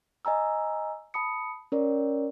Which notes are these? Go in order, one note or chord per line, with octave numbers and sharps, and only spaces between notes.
D#5 G#5 A#5 E6
A5 B5 D#6 C#7
C#4 A#4 C#5 D5